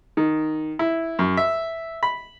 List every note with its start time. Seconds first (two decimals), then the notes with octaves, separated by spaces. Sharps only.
0.17 D#3
0.79 E4
1.19 F#2
1.37 E5
2.03 B5